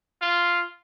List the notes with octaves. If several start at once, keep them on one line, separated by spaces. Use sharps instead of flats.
F4